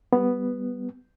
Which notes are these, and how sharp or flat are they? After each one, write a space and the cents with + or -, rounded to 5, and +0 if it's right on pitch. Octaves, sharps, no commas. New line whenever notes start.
G3 +0 B3 +0